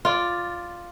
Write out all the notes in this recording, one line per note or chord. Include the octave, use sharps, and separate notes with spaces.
F4 D5